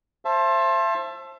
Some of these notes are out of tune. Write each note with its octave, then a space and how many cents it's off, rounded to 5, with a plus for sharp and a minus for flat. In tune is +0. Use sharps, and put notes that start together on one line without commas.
C5 +25 E5 +30 A5 +0